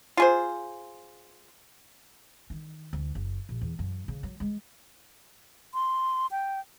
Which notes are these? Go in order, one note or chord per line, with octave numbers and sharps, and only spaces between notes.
F4 G#4 C5
D#3
D2
F#1
A#1
E2
F#2
C#3
F#3
G#3
C6
G5